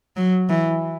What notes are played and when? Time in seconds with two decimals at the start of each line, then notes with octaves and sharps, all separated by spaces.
0.17 F#3
0.49 E3